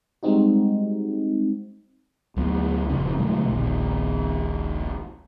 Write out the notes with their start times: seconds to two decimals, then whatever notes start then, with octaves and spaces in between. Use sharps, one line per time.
0.23 G3 G#3 C4 D#4 F#4
2.36 D2 F#3 B3
2.89 D#1 F2 C#3 C#4
3.18 B2 D3 F#3 A3
3.47 D#1 A#1 D#2